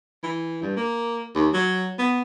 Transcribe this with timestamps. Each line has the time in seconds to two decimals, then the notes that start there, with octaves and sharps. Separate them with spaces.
0.23 E3
0.62 G2
0.77 A#3
1.35 D#2
1.54 F#3
1.99 B3